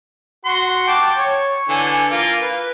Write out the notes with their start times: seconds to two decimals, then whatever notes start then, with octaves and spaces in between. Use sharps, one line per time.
0.45 F#4 C6
0.88 G5 A5 D6
1.17 C#5
1.69 D3 E3 G#5
2.11 A#3 F4
2.41 B4